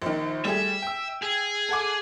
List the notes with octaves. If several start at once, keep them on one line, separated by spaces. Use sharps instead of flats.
A#1 D#3
G3 A3 G#4 E5
G5 E6
G#4
A4 F#5 D6